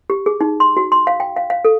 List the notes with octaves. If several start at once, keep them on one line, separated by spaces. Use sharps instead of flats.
G4
G#4
D#4
C6
F#4
C6
F5
G5
F5
F5
A4